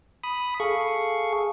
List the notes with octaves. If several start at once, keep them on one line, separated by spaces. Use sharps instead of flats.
B5 D#6
G#4 A4 F5 C#6